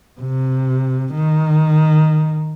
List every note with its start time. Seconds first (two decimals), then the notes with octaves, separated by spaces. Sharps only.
0.21 C3
1.15 D#3